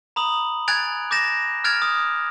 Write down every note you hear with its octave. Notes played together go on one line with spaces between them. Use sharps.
A#5 B5 D#6 F#7
G#5 F#6 G#6 A6 D7 F7
D6 G6 A6 A#6 E7
F6 F#6 G#6 A6 D7 F7
D#6